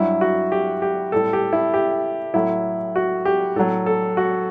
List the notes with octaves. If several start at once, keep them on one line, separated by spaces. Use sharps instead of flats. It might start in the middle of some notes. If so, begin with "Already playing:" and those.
Already playing: G2 F#3 E4
F#4
G4
G4
A2 G3 A4
G4
E4
G4
A2 F#3 E4
F#4
G4
A2 F#3 A4
A4
F#4